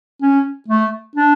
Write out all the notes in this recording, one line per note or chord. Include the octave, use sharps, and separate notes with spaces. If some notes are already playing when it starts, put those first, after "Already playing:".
C#4
A3
D4